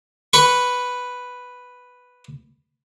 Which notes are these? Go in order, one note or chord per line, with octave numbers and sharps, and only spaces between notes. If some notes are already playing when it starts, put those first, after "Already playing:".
B4 C#6